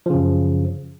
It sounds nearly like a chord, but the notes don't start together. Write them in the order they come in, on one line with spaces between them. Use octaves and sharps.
F3 C#3 F#2